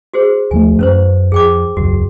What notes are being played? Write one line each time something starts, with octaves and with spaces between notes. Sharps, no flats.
F#4 G#4 C5
D#2 F3 A3 G#5
F#2 C#4 B4 C5
F2 G#4 G5 D6
E1 C#2 F#2 F#4